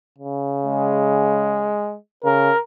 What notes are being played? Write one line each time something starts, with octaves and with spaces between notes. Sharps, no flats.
C#3
G#3
C#3 A#4